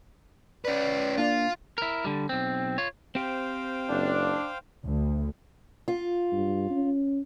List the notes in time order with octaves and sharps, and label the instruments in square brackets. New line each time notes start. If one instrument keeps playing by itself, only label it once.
[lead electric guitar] C#4 B4 [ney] D5
[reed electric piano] A#3 D4 [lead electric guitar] F4
[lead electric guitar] E4 A#4
D3 G3
B1 C4
F4 C#5
[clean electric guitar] C4 G4 [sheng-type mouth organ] C5 F5 G5
[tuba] F#1 [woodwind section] D4
[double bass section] D2
[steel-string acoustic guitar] F4
[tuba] G2
C#4